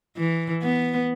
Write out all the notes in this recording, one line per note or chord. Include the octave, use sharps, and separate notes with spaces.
E3
B3